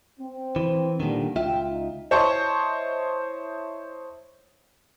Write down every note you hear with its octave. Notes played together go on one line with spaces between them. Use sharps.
C4
E3
A#2 D3 D#3 G3
C#2 F4 E5 G5
D#4
E4 C5 C#5 D#5 A5 C#6